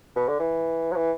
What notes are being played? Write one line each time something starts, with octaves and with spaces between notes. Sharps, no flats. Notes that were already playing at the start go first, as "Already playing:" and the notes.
B2
D3
E3
F#3
E3